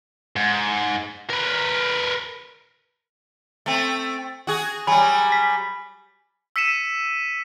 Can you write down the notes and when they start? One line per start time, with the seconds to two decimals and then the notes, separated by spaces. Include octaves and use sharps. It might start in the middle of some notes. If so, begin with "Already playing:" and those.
0.36 G#2
1.30 A#4 B4
3.66 A3 C4
4.47 F#4 G#4
4.87 F#3 G3 G#5 B5
5.32 B6
6.56 E6 B6 C#7 D#7 E7